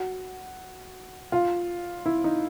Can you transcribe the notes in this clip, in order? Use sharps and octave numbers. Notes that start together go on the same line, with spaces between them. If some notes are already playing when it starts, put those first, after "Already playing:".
Already playing: F#4
F4
E4
D#4